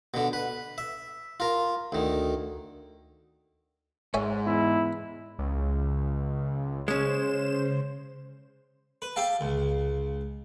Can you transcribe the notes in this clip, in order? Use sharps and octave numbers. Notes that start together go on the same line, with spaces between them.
B2 D3
B4
E5
F4 A#4
D2 D#3
G#2 C#5 E5 G#5
E2 E4
C#2
C#3 G#3 C#4 C5 E7
B4
G4 E5 F5 A5
C#2